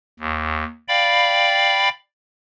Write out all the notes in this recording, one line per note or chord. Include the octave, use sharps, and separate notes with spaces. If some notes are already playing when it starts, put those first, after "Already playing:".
D#2
D5 F5 G5 B5